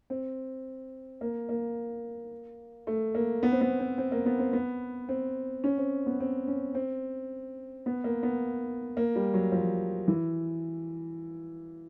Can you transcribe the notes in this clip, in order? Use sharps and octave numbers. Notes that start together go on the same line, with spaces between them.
C4
A#3
A#3
A3
A#3
B3
C4
B3
C4
C4
A#3
B3
C4
B3
C4
C#4
C4
B3
C4
C#4
C4
B3
A#3
B3
A#3
G3
F#3
F3
E3